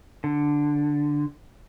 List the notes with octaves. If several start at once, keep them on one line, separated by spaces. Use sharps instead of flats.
D3